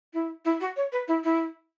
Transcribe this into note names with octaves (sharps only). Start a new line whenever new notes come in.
E4
E4
F#4
C#5
B4
E4
E4